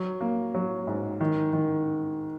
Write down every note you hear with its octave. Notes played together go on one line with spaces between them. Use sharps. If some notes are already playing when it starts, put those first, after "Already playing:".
Already playing: F#3
A#3
F#3
G#2
D#3
D#3